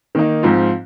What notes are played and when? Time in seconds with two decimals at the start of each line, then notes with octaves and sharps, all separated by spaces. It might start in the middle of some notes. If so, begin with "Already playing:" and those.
0.15 D#3 A#3 D#4
0.43 G#2 F3 C4 F4